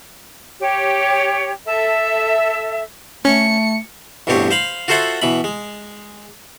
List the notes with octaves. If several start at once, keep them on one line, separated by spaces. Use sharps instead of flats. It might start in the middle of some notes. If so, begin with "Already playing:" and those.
G4 C#5
A4 E5
A3 C#4 C#7
A1 G2 B2 C4 G4 C#5
C5 F5 B5
F4 F#4 A4 C5 E5 F#5
B2 E3 B5
G#3